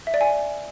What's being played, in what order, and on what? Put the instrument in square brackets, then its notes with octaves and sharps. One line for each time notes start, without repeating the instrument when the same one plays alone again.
[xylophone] E5
D5
G#5